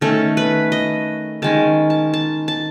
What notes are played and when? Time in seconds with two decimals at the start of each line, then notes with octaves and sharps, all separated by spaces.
0.01 D#3 A3 C#4 A4
0.37 B4
0.72 D#5
1.42 D#3 G#3 C#4 A5
1.90 A5
2.14 A5
2.48 A5